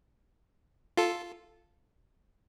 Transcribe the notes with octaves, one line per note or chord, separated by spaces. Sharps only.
F4 A4